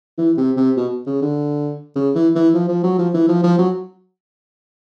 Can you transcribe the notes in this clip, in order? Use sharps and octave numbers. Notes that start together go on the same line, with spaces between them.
E3
C3
C3
B2
C#3
D3
C#3
E3
E3
F3
F3
F#3
F3
E3
F3
F3
F#3